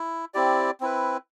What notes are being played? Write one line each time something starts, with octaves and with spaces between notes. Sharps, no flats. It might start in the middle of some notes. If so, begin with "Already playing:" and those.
Already playing: E4
C4 E4 G4 D5
C4 E4 B4